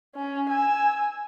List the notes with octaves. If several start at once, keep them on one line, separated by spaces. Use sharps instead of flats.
C#4
G#5 E6